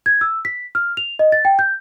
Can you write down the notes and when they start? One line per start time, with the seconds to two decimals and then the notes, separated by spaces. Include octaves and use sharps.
0.06 G#6
0.21 E6
0.45 B6
0.75 F6
0.97 F7
1.19 D#5
1.32 A6
1.45 G5
1.59 G6